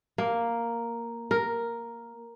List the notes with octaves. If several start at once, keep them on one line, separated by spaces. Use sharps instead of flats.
A#3
A#4